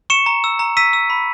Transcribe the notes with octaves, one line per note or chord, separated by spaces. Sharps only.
C#6 C#7 E7
A#5
E6
A#5
E6 B6 D#7
E6
B5